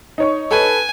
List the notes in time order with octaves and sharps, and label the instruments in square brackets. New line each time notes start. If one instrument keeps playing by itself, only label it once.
[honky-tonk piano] D#4 C#5 C#6
[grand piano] A4 B4 [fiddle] G#5